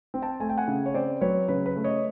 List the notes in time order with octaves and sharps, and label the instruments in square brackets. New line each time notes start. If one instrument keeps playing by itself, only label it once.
[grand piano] C4
G5 A5
A3 G#5
G5
F#5 G#5
C#3
C#5
C4 C5 D5
F#3 B4 C#5
C#3 B4
B4
A3
C#5 D#5